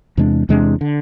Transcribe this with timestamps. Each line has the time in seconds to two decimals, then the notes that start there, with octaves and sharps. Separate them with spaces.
0.17 E2 C3 G#3 D4
0.49 E2 C3 G#3 D4
0.81 D3